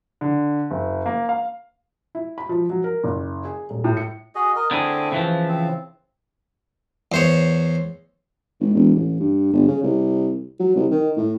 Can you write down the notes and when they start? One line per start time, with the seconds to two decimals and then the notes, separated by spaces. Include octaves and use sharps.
0.21 D3
0.71 F#1
1.06 A#3
1.29 F5
2.15 E4
2.38 B5
2.49 F3
2.70 F#3
2.84 A#4
3.04 F#1
3.45 G#4
3.70 D#1
3.84 A2
3.97 C#7
4.35 F#4 G#4 D#5
4.56 A#4 D#5
4.71 D3 A3 C4 E4 G#4
5.12 C#3 E3 F3
5.48 C4
7.12 E2 C5 C#5
8.60 G#1
8.74 E1
8.95 A1
9.20 G2
9.53 G1
9.68 C#3
9.83 C2
10.60 F#3
10.76 C2
10.91 D#3
11.17 A2